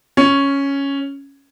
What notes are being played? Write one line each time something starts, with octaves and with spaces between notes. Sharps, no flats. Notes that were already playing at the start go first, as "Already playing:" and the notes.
C#4